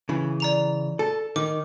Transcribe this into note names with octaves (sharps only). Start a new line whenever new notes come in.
C#3 E3
D5 A#5 F7
A4
D#3 D6